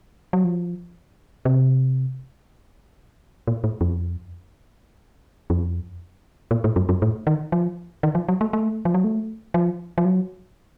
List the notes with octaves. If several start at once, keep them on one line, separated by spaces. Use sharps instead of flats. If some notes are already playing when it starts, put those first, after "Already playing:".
F#3
F3
C3
A#2
A2
F2
F2
A#2
A2
F#2
F#2
A2
D#3
F3
D#3
F3
F#3
A3
A3
F3
F#3
A3
F3
F3
F#3